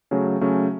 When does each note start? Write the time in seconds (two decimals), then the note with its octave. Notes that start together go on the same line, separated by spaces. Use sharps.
0.11 C#3 F#3 A3 C#4
0.41 C#3 F#3 A3 C#4